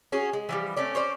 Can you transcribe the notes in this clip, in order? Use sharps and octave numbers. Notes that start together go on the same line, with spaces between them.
C#4 F#4 G#4
G#3
E3 F3 G3
A3 C4 C#4 D5
C#4 C5 D5